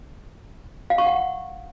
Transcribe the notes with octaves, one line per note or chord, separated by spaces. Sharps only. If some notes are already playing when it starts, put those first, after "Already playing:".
F5
C#6
F#5